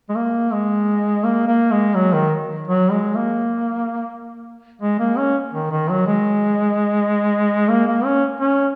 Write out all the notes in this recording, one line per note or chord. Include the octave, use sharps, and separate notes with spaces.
G#3
A#3
G#3
A#3
A#3
G#3
F#3
D#3
F#3
G#3
A#3
G#3
A#3
C#4
D#3
D#3
F#3
G#3
A#3
A#3
C#4
C#4